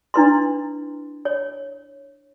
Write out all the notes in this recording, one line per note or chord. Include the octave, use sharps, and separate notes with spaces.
D4 E4 B4 C6
C#5